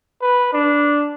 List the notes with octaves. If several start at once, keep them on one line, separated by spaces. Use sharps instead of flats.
B4
D4